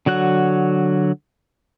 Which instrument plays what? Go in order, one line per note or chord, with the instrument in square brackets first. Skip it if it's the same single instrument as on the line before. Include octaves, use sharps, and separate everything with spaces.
[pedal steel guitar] D3 F#3 F#4 F#6